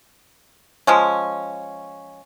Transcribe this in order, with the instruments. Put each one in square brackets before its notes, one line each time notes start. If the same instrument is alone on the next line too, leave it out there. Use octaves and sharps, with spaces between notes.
[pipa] F3 G#3 C#4